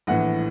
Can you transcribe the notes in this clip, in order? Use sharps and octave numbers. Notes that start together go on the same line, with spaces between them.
A#1 A2 E3 F#5